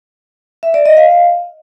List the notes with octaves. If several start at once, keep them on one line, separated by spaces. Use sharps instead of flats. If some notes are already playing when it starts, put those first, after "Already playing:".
E5
D5
D#5
F5